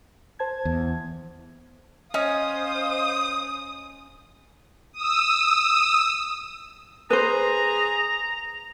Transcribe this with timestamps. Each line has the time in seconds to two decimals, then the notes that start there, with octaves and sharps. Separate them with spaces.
0.39 C5 A5 G#6
0.65 E2
2.14 C#4 C5 D#5 F5 D#6
4.92 D#6 E6
7.11 G#4 B4 C5 A#5